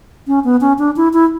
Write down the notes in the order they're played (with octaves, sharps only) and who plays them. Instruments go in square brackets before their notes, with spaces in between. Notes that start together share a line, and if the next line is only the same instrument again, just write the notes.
[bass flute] C#4
B3
C#4
D4
E4
E4